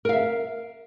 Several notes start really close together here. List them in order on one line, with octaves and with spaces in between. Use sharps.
A#4 F5 E5